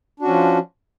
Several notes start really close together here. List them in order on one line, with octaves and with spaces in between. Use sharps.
D4 F#4 C#4 F3